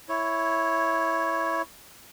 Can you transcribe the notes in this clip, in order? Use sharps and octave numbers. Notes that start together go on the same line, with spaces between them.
E4 C#5